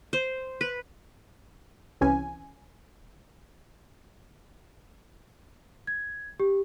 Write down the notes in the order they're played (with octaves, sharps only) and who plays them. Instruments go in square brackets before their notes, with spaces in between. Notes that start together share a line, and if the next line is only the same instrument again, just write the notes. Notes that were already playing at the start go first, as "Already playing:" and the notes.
[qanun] C5
B4
[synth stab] C2 C3 E3 C#4 G#5
[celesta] G#6
G4